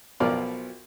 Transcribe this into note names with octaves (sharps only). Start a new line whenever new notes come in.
B1 B2 F3 F4 A#4 D5